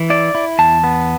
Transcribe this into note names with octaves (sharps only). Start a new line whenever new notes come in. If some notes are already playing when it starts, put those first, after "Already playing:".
Already playing: E3
E4 D5
E4
E2 A5
B3